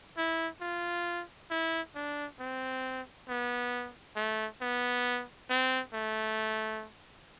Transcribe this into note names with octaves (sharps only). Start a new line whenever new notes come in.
E4
F4
E4
D4
C4
B3
A3
B3
C4
A3